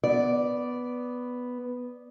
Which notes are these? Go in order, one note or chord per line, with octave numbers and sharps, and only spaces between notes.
B3 D5